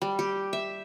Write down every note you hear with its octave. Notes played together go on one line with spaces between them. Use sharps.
G3
G4
E5